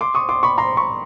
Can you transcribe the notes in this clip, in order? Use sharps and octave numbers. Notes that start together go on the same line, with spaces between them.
C6 D6
C#6 D#6
C6 D6
B5 C#6
A#5 C6
B5 C#6